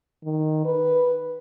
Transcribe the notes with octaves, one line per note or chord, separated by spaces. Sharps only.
D#3
B4